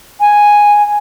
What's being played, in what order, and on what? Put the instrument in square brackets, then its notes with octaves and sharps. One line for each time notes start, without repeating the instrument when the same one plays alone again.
[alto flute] G#5